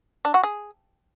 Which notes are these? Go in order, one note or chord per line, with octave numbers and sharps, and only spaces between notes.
D4
F#4
G#4